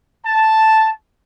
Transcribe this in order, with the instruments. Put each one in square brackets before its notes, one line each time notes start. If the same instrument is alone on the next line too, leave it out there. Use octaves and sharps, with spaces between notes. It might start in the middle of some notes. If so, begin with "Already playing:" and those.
[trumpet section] A5